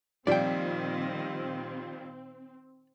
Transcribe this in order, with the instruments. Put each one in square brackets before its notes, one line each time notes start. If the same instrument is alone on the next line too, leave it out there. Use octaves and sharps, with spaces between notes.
[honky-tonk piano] A#2 F3 G3 [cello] D#3 [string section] C4 [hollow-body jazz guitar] D5 G5